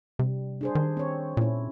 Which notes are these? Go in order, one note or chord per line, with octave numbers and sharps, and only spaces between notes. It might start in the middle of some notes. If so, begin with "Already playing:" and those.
C3 G3
D4 G#4 C5
D#3
C4 C#5
A#2 C#4 E4